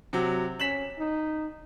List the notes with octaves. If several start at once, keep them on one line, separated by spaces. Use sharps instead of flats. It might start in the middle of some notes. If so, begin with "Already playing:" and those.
C3 F#3
C#4 B6 E7 F#7
D#4